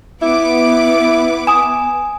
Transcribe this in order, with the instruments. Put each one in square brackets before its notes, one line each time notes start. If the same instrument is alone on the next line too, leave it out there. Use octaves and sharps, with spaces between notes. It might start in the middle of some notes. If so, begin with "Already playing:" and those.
[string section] B3 B4 D6 [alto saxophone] E4
[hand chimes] G#5 [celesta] D#6 E7